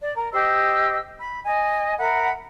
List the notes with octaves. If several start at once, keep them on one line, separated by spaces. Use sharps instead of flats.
D5
A#4
G4 C5 D#5 E6
B5
D#5 G#5
A#4 E5 F#5 B5